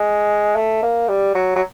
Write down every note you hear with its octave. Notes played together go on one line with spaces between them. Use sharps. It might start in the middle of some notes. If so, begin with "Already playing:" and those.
Already playing: G#3
A3
A#3
G3
F#3
F#3